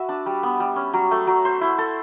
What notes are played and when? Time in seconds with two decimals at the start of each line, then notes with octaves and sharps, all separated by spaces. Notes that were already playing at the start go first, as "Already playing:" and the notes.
Already playing: F#4 B4 E5
0.09 D4
0.26 G3
0.43 B3
0.60 G3
0.76 C#4
0.93 F#3
1.11 A3
1.27 F#3
1.45 C5
1.61 E4
1.78 A4